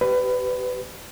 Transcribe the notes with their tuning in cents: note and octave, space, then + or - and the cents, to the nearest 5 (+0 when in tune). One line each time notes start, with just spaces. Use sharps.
G4 -25 B4 +20 D5 -20